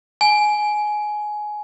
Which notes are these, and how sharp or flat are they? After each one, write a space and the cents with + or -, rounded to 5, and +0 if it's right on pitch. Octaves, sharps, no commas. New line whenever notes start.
G#5 +15